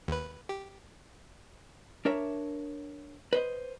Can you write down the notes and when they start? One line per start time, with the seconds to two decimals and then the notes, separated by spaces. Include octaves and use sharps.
0.08 D#2 B4
0.49 G4
2.05 D4 A#4 C#5 E5
3.33 B4 C5 D#5